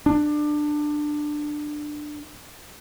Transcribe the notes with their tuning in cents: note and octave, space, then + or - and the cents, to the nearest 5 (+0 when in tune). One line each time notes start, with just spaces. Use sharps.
D4 +20